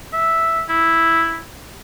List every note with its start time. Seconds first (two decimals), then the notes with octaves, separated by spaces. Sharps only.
0.13 E5
0.69 E4